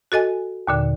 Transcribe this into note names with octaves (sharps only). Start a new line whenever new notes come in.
F#4 A4 D#5 G#5
D#2 A#2 D3